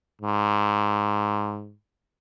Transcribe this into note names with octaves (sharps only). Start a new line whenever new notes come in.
G#2